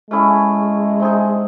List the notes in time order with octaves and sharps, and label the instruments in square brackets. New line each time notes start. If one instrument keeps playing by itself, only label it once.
[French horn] G#3 [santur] A3 C#4 E4 G#4
[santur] C4 D#4 G#4